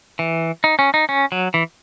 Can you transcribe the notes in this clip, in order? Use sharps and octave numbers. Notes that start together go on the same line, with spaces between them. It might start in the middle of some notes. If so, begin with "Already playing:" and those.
E3
D#4
C#4
D#4
C#4
F#3
E3